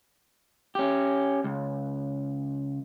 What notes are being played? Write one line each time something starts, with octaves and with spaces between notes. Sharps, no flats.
C#4 G4
C#2